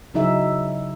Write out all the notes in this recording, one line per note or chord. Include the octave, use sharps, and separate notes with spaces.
C#3 F#3 D#4 E4 G#4 E5